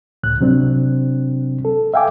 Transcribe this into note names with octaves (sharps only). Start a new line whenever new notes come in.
C#2 A2 F#6
C3 F#3 C4 D4
A4
E5 F5 G5 G#5 D6